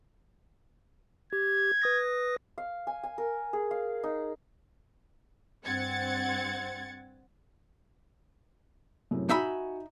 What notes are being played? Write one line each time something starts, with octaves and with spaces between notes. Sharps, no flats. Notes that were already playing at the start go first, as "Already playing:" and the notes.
G4 G#6
B4 D#6 A#6
F5
G#5
G#5
A#4
G#4
F5
D#4
G2 C4 F#5 G#6 A6 C#7
F#2 A2 C3
D#4 F#4 E5 G#5 B5